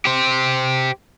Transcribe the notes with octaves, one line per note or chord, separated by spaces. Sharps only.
G4 C5